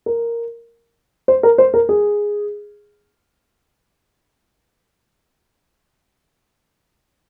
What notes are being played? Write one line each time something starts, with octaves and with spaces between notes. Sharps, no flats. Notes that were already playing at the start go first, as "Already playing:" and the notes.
A#4
C5
A#4
C5
A#4
G#4